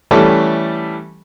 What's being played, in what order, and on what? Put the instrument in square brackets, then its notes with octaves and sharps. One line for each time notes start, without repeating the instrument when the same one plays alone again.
[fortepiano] E3 G3 A3 C#4 A4